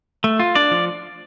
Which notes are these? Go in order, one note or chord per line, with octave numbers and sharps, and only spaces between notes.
A3
F4
D4 D5
F3